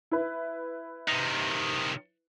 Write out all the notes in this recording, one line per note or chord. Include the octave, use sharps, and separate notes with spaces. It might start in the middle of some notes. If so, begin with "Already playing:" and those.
E4 B4
C3 D#3